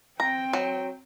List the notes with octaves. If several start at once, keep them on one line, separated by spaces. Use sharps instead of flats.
C4 G5 A#5
F#3